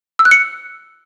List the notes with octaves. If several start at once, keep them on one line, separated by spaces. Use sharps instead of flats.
E6
F#6
C#7